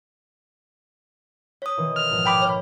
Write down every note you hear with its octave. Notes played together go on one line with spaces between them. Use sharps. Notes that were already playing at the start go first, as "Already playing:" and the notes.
C#5 C#6 D#6 F#6 B6
B2 D#3 E3
F6
A#1 G#2 B2
G5 B5 D6 G#6
C#5